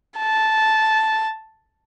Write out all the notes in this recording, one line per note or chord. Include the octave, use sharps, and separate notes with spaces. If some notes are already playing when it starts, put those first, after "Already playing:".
A5